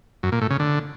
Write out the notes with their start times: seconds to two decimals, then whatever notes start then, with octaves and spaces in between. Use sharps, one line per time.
0.23 F#2
0.32 A#2
0.41 A2
0.50 C#3
0.60 D3